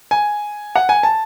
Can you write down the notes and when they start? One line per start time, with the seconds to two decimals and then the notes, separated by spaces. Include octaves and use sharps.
0.11 G#5
0.75 F#5
0.89 G#5
1.03 A5